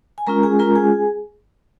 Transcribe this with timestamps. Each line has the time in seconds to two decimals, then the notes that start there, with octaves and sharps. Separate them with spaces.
0.18 G#5
0.27 G#3 C#4 F4 A#4 A#5
0.43 G#4 G#5
0.59 G#3 C#4 F4 A#4 A#5
0.76 G#4 G#5